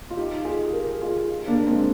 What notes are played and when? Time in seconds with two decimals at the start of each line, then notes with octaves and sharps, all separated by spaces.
0.10 F4
0.17 D#4 G4
0.45 F4 G#4
0.73 G4 A#4
1.01 F4 G#4
1.47 A#3 D4
1.67 G#3 C4